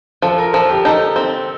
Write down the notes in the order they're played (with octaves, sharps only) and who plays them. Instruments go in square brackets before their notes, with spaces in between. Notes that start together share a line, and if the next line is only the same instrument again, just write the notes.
[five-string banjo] F3 [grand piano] A4
[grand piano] A#4
[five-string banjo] F3 [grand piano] A4
[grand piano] G4
[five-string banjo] D#4 [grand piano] A4
[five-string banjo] C4